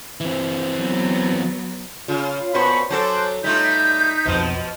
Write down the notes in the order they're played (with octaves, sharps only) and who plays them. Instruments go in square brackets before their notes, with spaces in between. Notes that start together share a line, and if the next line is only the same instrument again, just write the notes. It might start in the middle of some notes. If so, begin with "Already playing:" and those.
[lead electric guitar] E3 C4
[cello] F#3 B3
[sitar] C#3 [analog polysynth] F4 F5
[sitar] A#2 F#4 C5 [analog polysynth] B3 C#6 [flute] A5 [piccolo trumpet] B5
[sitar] F#3 F#4 A4 [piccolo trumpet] C5 [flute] G#5 [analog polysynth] A5 D6 F#6
[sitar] G3 A3 F4 [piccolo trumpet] D#4 [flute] G6 [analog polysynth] B6
[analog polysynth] B1 F2 [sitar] B2 F3